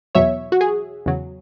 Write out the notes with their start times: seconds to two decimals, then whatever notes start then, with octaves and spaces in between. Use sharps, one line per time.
0.15 E2 B2 F#3 C#5 E5
0.52 F#4
0.61 G#4
1.06 E2 C#3 F#3